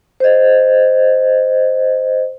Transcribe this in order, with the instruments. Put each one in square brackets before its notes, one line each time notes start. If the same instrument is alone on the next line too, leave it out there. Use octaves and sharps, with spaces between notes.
[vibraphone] C5 D#5